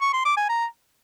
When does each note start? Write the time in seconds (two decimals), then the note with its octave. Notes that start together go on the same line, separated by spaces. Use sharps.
0.01 C#6
0.13 C6
0.25 D6
0.37 G#5
0.49 A#5